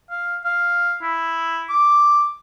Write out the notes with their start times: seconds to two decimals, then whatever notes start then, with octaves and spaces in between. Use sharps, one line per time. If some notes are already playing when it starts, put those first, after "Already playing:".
0.10 F5
0.45 F5
1.02 E4
1.69 D6